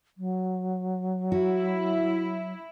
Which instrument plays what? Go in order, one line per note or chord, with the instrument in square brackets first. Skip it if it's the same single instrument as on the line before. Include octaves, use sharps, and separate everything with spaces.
[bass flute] F#3
[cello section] E4 [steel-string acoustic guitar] F#4